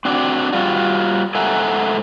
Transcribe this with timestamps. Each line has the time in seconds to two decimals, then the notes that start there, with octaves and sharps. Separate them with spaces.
0.05 C4 D4 F#4 D5
0.53 G3 F4 F#4
1.35 G#2 A4 E5 F#5 G#5 A#5